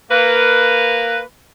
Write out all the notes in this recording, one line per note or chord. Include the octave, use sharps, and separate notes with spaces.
A#3 B4